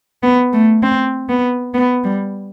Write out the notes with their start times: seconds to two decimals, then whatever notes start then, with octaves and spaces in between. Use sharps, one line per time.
0.23 B3
0.53 A3
0.83 C4
1.29 B3
1.74 B3
2.04 G3